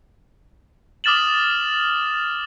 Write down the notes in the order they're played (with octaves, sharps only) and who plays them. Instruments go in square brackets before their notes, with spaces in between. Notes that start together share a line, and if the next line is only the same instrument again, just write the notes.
[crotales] D6 D#6 F6 A6 E7 F#7